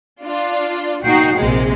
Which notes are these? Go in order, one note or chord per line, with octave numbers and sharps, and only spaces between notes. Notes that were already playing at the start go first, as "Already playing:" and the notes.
D4 F4
A#2 D#4 F#4 G5 C7
A#1 C3 G#3 A#3